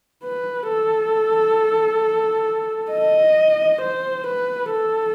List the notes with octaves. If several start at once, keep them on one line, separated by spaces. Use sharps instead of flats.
B4
A4
D#5
C5
B4
A4